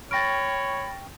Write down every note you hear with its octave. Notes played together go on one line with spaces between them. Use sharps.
C#5 G5 B5 C#6 F6 A6 A#6 D7